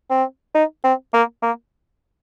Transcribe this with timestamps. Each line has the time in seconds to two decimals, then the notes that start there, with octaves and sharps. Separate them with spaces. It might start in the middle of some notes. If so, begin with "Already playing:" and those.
0.10 C4
0.55 D#4
0.84 C4
1.14 A#3
1.42 A#3